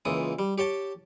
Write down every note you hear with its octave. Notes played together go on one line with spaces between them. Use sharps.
C#2 A#2 E3 D#6
G3
G4 C#5 G5 A5